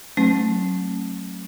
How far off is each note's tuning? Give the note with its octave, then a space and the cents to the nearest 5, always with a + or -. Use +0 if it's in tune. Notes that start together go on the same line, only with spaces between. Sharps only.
F#3 +0 A3 +0 C#4 -35